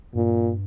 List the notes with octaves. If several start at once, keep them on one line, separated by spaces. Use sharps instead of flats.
G2 A#2